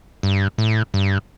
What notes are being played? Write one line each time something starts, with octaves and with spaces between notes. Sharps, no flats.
G2
A2
G2